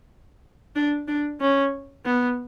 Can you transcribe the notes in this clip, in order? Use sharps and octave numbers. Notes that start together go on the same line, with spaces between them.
D4
D4
C#4
B3